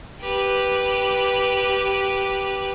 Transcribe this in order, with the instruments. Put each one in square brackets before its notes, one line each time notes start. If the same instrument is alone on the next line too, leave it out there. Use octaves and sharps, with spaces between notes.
[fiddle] G4 B4